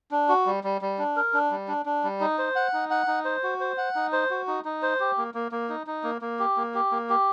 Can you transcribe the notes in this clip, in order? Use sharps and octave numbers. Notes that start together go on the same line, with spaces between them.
D4
F#4
G3
G3
G3
D4
A#4
D4
G3
D4
D4
G3
D#4
C5
F#5
D#4
F#5
D#4
C5
F#4
C5
F#5
D#4
C5
F#4
D#4
D#4
C5
G4
A#3
A#3
A#3
D#4
D#4
A#3
A#3
G4
A#3
G4
A#3
G4